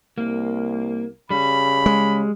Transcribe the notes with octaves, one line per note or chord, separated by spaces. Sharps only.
C2 A#3
C#3 G3 B5
G#3